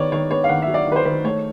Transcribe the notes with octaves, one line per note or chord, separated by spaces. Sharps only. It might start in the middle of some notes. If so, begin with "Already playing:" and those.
Already playing: D#3 B3 C#5 D5
D#3 C#5
B3 C#5
F5
D#3 F#5
E5
F#3
D5
D#3
B4
C5
D#3 B4
A3 C#5